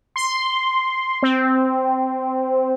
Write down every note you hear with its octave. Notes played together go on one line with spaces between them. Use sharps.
C6
C4